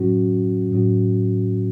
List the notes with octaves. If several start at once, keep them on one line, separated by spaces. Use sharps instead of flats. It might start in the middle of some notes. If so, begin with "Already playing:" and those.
Already playing: A2 F#3 C#4 F#4
A2 F#3 C#4 F#4